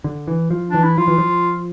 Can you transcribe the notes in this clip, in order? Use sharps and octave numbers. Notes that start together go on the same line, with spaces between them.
D3
E3
F3
E3 D4
E4
F3 F4
E3
F3